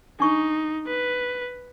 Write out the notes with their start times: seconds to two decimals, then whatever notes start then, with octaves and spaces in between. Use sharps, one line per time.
0.20 D4 D#4 C#6
0.87 B4